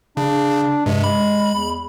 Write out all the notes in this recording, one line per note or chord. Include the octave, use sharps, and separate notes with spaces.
C#3 D4
G2 C3 G#3
G#3 B5
E2